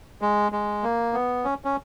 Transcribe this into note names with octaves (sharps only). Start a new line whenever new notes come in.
G#3
G#3
A#3
B3
C#4
C#4